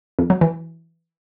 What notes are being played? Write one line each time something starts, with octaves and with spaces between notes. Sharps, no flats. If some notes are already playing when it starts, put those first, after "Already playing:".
F2
F#3
E3